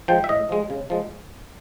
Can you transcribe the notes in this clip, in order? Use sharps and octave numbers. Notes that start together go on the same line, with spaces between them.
F3 G#3 G5
E5
A2 D#5
F3 G#3
C#3
F3 G#3